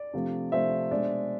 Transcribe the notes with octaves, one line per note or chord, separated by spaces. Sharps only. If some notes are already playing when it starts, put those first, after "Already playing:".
Already playing: D5
C3 F3 A3 D4
C3 F3 A3 D4 C5 E5
B2 G#3 D4